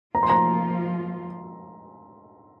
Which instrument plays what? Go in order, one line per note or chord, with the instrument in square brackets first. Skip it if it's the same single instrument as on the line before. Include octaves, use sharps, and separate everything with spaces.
[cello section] F3 A#3 F4 [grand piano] A#5
[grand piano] C6
A#5